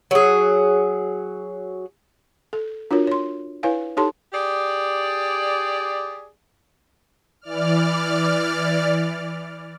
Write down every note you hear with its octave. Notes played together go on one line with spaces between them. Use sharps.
F#3 G#4
A4
D4 F4 F#4 A#4 C#5
C#5 C6
E4 B4 C#5 F5 G#5
D#4 G4 A4 C#5 A5 C6
G4 G#4 D5
E3 D5 F6